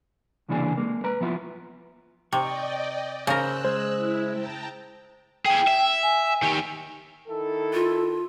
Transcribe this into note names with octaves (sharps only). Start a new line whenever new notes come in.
C2 C#3 E3 A#3 D4 G#4
G#3 A#3
B4 A#5
F3 B3 E4 F4
C3 D5 D#5 G5 C#6
C#3 A#4 C5 E6 F#6
G#3 C5
E4
G5 A5 A#5
E4 G#4 G5
E5
G#5
D#3 G4
D#3 E4 A4
F4